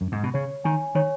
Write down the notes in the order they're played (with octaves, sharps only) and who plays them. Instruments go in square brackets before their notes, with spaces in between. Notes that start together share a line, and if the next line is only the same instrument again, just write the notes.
[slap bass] F#2
G#2
B2
[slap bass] C#3 [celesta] C#5
[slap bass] D#3 [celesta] G#5
[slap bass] D#3 [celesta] C#5